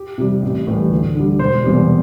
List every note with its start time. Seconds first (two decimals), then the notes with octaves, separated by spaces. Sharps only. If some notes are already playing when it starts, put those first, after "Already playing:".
Already playing: G4
0.18 C3 G3
0.42 A1
0.67 A2 E3 G3
0.91 D2
1.15 D3 G3
1.39 E1 C5
1.64 E2 C3 E3 G3